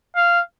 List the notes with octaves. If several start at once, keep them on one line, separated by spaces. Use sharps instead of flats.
F5